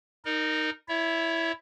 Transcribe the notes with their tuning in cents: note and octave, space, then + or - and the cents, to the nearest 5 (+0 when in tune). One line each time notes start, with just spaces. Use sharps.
D#4 +0 A#4 +0 D#5 -35
E4 +0 C#5 +30 E5 +0